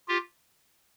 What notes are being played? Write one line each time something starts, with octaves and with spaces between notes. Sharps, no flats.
F4 G4